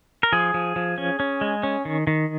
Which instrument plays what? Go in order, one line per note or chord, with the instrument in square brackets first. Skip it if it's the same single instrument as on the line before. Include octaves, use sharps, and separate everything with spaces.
[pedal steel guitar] A#4
F3 G#4
F3
F3
C#4
C#4
G#3
C#4
D#3
D#3